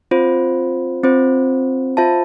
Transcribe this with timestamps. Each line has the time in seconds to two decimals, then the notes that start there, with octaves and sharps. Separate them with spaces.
0.11 C4 F4 C5
1.04 C4 F4 C5
1.97 F4 C5 E5 A5